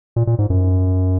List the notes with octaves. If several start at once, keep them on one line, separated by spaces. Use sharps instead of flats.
A#2
A#2
G#2
F#2